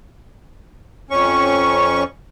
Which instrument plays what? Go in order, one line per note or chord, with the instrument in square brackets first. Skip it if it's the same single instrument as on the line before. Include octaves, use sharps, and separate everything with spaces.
[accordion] F2 C#4 C#6